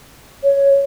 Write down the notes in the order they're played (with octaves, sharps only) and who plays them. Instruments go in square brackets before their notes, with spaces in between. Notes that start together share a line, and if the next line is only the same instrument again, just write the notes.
[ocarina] C#5